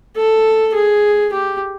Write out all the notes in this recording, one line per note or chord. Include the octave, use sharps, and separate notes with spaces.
A4
G#4
G4